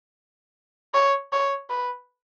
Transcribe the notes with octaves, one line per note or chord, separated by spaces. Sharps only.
C#5
C#5
B4